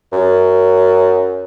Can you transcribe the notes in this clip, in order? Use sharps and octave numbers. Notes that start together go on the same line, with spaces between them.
F#2